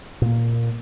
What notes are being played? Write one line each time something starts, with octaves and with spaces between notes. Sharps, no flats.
A#2 A#3